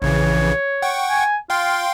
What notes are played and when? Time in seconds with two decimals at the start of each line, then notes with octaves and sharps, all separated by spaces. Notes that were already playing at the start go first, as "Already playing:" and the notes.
0.02 A#1 C#3 E3 C#5
0.82 F#5 G5 C#6
1.09 G#5
1.50 F4 F5 G5 C6